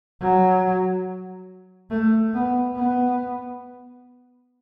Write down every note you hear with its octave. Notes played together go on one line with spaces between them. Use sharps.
F#3
A3
B3
B3